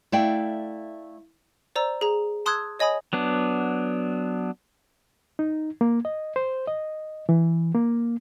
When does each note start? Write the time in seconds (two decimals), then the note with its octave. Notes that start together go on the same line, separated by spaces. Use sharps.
0.12 A3 E4 D5 F5 G5
1.76 C5 D5 A#5 E6
2.01 G#4 A#5
2.46 A5 C6 D#6 E6 F#6 G#6
2.79 C#5 D#5 G#5 B5 D#6
3.13 F#3 B3 D4
5.39 D#4
5.81 A#3
6.05 D#5
6.36 C5
6.68 D#5
7.29 E3
7.75 A#3